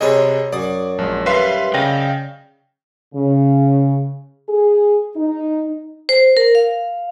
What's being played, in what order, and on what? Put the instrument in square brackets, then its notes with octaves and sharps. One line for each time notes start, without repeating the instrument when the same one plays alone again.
[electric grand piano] C3 G#4 D#5 [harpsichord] G3 G#3 C#5
[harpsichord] F#2 D#6 [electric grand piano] D5
[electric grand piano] A#1 G#3 [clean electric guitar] F3
[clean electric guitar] G3 E5 F5 [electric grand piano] B4 C6
[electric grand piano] C#3 G5 [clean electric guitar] D5 D#5 F5
[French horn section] C#3
G#4
D#4
[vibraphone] C5
A#4
F5